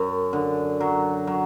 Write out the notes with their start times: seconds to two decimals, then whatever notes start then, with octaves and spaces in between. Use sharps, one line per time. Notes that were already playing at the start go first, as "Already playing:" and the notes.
Already playing: F#2
0.33 D3
0.80 F#3
1.27 F#3